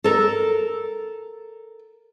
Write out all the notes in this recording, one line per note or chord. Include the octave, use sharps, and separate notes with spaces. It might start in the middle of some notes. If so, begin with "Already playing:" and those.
A4 A#4